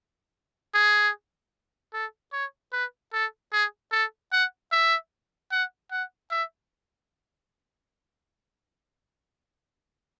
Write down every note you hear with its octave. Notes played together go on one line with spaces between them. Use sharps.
G#4
A4
C#5
B4
A4
G#4
A4
F#5
E5
F#5
F#5
E5